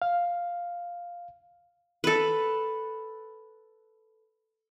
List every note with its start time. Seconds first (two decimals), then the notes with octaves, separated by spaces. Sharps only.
0.02 F5
2.04 A4 B4